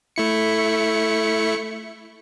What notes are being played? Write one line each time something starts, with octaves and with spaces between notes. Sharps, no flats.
A3 E4 C#7